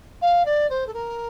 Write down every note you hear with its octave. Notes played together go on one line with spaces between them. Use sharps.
F5
D5
C5
A4
A#4